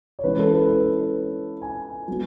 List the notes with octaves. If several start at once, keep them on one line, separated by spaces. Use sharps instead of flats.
C#5
E3 G#3 C#4 E4 B4
A4
B4
B4
G#5
F#3 B3